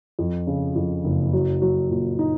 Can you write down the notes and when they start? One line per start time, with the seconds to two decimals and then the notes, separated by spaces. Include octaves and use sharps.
0.19 F2
0.47 C#3
0.76 F2
1.04 F#1
1.33 F#3
1.62 F#3
1.90 A#2
2.19 D#4